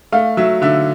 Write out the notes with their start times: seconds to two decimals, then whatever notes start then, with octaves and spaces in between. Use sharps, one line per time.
0.12 A3 F5
0.37 F#3 E5
0.62 D3 E5